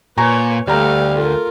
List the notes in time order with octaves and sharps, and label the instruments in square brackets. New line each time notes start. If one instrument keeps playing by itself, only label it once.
[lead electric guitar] A#2 [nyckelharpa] B4 C#5 [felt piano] G#5 A#5 C#6
[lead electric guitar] D2 [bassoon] G3 [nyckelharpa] A3 F5 [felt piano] D5 A#5
[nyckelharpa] F4 A#4 [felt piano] A4